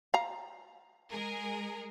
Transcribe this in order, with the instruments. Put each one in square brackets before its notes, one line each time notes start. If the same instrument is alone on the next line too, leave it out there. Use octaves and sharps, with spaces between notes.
[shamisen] F5 A#5
[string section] G#3 G#4 A#4